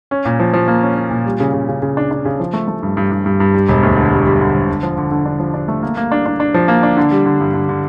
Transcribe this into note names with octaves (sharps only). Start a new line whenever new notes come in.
C#4
A#2
F3
F3
A#3
C#4
C#4
A#2
G3
C#3
C#3
C#3
C#3
D4
D4
C#3
F3
A3
A3
G2
G2
G2
G2
G2
G3
E1
D2
D3
G3
G3
D3
E1
D3
F3
D3
D3
D4
F3
D4
A3
A#3
A#3
D4
D4
D4
F3
A#3
D4
D3
G3
D3
G2
D3
D3